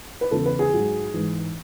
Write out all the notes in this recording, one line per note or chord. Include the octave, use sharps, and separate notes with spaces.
B4
E2 C#3 E3 A4
B4
G#4
G#2 F#3
G#2 E3